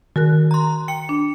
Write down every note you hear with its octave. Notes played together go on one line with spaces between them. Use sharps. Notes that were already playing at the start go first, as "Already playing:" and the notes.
D#3 F#4 A#4 F#6
A#5 C6
G5 C#7
D4